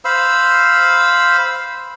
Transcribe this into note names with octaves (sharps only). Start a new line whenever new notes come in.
C5 F5 B5 E6